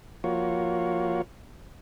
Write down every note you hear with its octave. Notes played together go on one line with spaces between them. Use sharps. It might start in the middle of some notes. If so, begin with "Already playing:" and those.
F3 A#3 F4 F#4 C#5